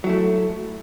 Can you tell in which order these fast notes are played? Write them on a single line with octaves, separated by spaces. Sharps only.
F#3 E4 A3